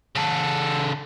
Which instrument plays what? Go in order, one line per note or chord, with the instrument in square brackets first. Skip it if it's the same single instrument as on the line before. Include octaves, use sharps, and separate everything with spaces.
[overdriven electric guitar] C#3 A4